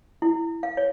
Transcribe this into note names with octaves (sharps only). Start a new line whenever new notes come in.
E4
F5
C#5